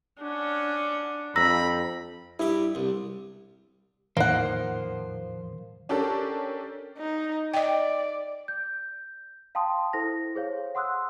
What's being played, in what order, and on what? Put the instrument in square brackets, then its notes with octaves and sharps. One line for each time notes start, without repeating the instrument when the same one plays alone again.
[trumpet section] C#4 F#5 [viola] D4
[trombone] F2 [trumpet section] G3 B5 [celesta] A#5 E6 A#6
[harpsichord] G2 G4 [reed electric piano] E4
[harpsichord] C2
[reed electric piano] E2 A2 D#3 [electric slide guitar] F3 C5 [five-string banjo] A#3 F#5
[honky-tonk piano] C#4 D4 G4 A4 A#4
[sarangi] D#4
[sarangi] D5 [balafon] D#5 G5
[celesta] G6
F5 G5 A5 C6 D#6
E4 A4 C5 A#6
G#4 C5 C#5 F5
F#5 C6 D#6 E6 F#6